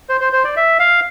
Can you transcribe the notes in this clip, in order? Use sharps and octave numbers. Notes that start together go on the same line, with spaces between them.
C5
C5
C5
D5
E5
F5